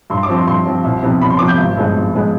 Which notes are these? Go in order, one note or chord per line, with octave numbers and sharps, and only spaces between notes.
G2 C6
D6
F3 C4
C6
G2 C6
F3 C4
C2
C3 F3 B3
C2 B5
C6
C3 F3 B3 D6
G6
G#1
G2 F3 G#3 B3
G#1
G2 F3 G#3 B3